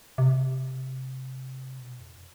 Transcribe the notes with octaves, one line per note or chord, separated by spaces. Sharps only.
C3
B2
F2